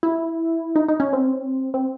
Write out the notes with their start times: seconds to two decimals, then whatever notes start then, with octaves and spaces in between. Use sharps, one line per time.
0.03 E4
0.76 D#4
0.88 D#4
1.00 C#4
1.13 C4
1.74 C4